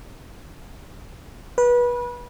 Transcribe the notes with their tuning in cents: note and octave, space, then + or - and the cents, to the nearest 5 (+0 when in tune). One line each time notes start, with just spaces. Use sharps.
B4 -25